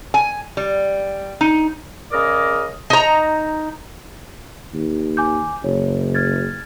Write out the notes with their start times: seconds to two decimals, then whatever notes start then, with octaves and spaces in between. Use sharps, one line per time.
0.14 G#5
0.57 G3
1.41 D#4
2.12 C#3 G#4 A#4 D5 D#5
2.90 D#4 A#5
4.74 D#2
5.17 G#5 D6 G6
5.64 F#1 C#5
6.15 F6 G#6 A6